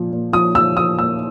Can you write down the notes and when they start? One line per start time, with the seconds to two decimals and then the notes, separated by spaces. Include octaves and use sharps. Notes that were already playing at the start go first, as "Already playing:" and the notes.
Already playing: A#2 F3
0.12 A#2
0.33 F3 D#6
0.55 F3 E6
0.77 F3 D#6
0.99 A#2 E6